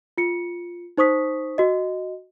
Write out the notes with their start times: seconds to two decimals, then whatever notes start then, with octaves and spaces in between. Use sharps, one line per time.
0.18 F4 C#7
0.97 D#4 C5 C#6 D#6 B6
1.58 F#4 D#5